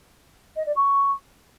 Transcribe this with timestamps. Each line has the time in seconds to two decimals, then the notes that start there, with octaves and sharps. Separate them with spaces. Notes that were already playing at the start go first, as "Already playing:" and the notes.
0.56 D#5
0.66 D5
0.76 C#6